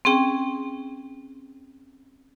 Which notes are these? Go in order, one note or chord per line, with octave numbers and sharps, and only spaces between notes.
C4 C#4 G#4 G5